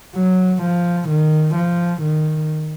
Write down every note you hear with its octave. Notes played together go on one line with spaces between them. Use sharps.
F#3
F3
D#3
F3
D#3